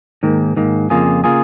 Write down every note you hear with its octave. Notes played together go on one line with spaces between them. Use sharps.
G#2 D#3 A#3
G#2 D#3 A#3
F2 C#3 A#3 F4 G#4
C#3 A#3 F4 G#4